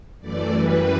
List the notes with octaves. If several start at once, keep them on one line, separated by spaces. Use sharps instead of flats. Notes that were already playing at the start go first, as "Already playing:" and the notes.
F#2 E3 A3 D5
F#2 E3 G3 B4